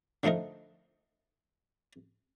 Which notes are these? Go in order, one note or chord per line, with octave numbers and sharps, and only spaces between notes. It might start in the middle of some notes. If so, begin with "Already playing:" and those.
D3 F3 A3 D#4 A#4